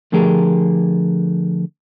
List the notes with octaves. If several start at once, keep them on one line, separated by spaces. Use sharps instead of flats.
D3 F3 A3 G4 G#4 A#4